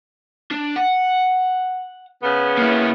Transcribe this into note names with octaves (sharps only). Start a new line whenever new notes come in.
D4
F#5
C#3 B3
A#3 E4